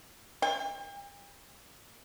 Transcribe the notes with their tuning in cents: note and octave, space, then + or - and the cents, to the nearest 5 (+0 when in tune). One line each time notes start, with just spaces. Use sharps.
G5 +40